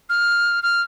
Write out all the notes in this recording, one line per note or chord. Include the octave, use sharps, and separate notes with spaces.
F6
F6